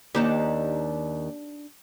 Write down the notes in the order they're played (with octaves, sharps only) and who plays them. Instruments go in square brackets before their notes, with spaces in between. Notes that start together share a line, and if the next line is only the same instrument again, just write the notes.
[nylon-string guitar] D#2 [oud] D4 D#4 G4